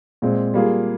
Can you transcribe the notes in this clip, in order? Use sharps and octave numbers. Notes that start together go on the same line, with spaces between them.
A#2 G#3 C4
G3 A#3 F4 G#4